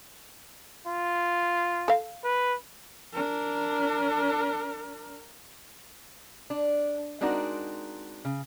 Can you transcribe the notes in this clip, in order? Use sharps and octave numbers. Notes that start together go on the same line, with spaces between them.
F4
A4 F5
B4
D4 A#4
D4
G#3 C4 D4 D#4 F#4 A#4
C#3